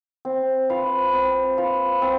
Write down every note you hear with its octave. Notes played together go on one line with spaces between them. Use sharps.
C4
F4 B4 F5
C4
F4 B4 F5
C4